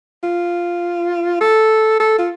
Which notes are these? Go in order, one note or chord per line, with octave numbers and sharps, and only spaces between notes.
F4
A4
A4
F4